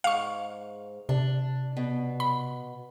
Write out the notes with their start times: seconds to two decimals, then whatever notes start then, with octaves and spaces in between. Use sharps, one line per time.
0.04 G#2 F5 C#6
1.09 C3 D4
1.77 B2
2.20 B5